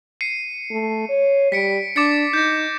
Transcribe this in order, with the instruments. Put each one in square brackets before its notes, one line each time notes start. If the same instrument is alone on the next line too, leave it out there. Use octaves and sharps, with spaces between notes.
[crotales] C7 C#7 D#7
[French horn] A3
C#5
[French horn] G3 [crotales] B6 C#7 D7
[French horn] D4 [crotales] D6 A6 C#7
[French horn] D#4 [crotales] G6 A#6